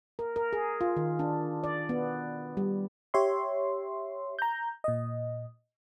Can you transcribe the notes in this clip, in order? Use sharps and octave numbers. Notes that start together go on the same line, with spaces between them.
A#4
A#4
G#4
F4
D#3
D4
D5
B3
G3
G4 C#5 E5 C6
A#5 G6
A#2 D#5